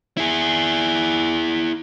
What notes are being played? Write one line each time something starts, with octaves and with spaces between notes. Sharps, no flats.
E4 G#4